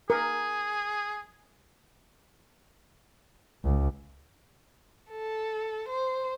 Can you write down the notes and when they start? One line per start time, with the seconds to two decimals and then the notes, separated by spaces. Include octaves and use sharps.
0.10 G#4 A#4
3.64 C#2
5.11 A4
5.88 C5